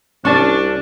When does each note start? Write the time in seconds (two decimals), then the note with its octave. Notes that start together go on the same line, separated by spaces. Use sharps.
0.25 C2 C#4 D4 D5 A5 C#6